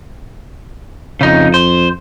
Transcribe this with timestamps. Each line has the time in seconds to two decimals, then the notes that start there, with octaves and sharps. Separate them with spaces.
1.21 F2 C#3 D#4
1.54 C5